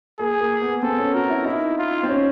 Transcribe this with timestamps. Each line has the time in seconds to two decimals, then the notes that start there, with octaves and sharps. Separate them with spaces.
0.19 A#3 G#4
0.41 A#3
0.62 B3
0.83 C4 A4
0.99 C#4
1.14 F#4 A#4
1.30 E4
1.45 D#4 E4
1.78 F4
2.03 C4
2.08 C#4